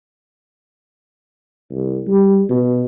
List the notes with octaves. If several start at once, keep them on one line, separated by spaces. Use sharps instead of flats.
C2
G3
B2